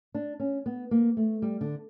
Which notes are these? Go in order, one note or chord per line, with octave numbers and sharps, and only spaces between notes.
D4
C#4
B3
A#3
A3
G3
D3